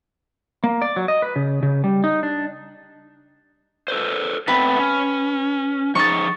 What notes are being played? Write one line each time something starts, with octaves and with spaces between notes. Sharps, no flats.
A#3
D5
F#3
D#5
B4
C#3
C#3
G3
D#4
D4
A4 B4 C5
A3 B3 C4 B4
C#4
F3 D#4 G#4 C#6 A6